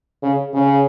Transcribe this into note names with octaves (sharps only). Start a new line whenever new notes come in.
C#3
C#3